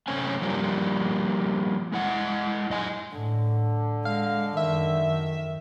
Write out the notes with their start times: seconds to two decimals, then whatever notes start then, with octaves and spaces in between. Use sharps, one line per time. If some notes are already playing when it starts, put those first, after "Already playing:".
0.08 F#2 C3 A3 C4 C#4 G#5
0.42 F3 G3 A#3 D4 F4
1.92 G#3 E4 F#5
2.70 F#2 D#5 G#5
3.13 A2 D3
4.05 G#3 F5
4.57 F#2 D#3 E5